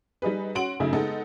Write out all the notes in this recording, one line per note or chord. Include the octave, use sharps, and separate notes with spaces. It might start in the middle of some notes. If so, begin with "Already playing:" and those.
G3 D#4 G#4 B4
C#4 F#4 C6 D7 F#7
F#2 C#3 A3 D#4 E4
G#3 B3 D#4 A4